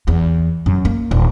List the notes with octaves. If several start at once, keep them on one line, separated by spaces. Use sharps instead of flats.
E2
F#2
A#3
D#1